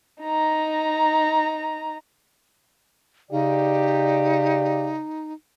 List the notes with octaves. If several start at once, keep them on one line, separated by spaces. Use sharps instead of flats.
D#4 A#5
C#3 D#4 G4 D5